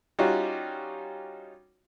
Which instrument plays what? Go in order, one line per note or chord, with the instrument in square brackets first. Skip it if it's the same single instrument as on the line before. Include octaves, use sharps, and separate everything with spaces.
[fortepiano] G3 C#4 D#4 F4 F#4